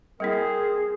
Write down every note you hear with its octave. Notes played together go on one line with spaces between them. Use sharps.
G3 A#3 C4 E4 G#4 A#4